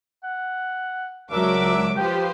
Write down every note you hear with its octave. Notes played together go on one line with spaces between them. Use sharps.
F#5
C#2 F#3 D4 A#4 E5 D6
F3 G4 B4 C5 G5